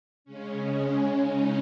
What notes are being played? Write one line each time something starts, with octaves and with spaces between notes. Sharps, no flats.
C#3 G#3 C#4
D#4